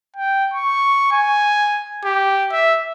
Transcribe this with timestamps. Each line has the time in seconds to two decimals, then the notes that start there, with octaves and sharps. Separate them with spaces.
0.16 G5
0.54 C#6
1.12 G#5
2.05 G4
2.52 E5